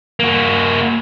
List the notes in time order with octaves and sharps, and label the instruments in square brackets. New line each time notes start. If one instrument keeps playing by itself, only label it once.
[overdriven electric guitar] A#3 F#4